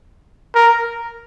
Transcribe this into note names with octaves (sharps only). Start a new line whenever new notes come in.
A#4